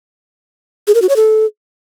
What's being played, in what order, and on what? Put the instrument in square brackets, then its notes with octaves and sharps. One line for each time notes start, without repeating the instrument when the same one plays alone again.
[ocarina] G#4
A#4
F#4
C#5
A4